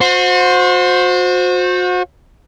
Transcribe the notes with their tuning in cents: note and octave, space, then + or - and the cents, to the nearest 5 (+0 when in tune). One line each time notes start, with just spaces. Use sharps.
F#4 -35 C5 +0